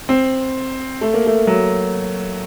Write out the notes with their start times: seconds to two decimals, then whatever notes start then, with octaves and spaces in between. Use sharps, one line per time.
0.09 C4
1.01 A3
1.14 A#3
1.26 A3
1.47 F#3